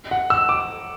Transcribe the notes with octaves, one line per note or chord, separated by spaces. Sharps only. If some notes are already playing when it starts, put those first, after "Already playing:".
F#5
E6
D6